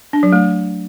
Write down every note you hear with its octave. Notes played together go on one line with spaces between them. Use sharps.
D4
F#3
A3